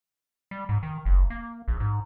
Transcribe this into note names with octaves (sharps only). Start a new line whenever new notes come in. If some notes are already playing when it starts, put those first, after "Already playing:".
G3
G#2
D#3
F#1
A#3
A#1
G#2